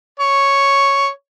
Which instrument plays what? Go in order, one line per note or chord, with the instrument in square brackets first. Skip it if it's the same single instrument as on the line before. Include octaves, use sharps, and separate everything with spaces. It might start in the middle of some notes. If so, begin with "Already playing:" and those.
[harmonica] C#5